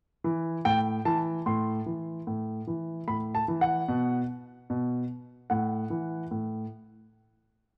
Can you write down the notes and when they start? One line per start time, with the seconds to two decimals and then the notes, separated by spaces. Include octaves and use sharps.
0.24 E3
0.65 A2 G5
1.05 E3 A5
1.46 A2 C6
1.86 E3
2.27 A2
2.67 E3
3.08 A2 B5
3.35 A5
3.48 E3
3.61 F#5
3.88 B2
4.70 B2
5.50 A2 F#5
5.90 E3
6.31 A2